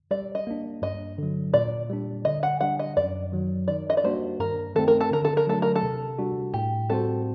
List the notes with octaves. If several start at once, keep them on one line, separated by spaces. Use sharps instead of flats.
G3 D5
D#5
A#3 D4
G2 D#5
D3 F#3
A#2 D5
G3 D4
D3 D#5
F#5
G3 D4 F#5
D#5
F#2 D5
D#3 F#3
D#3 D5
D#5
D5
G3 A#3 D4 F#4 C5
G2 A#4
D#3 A3 C4 A4
A#4
A4
D3 A#4
A4
A#4
F#3 A3 D4 A4
A#4
A4
C3
G3 D4 F#4
A2 G4
G3 C4 F#4 A4 C5